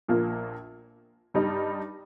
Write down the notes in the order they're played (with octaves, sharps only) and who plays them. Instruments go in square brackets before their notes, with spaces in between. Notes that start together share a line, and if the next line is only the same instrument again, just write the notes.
[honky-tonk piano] A#1 A#2 F3 A#3 F4
G2 G3 D#4